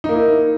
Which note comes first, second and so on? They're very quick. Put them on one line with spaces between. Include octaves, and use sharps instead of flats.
D#4 A#3 E4